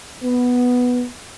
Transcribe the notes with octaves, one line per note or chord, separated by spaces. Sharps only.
B3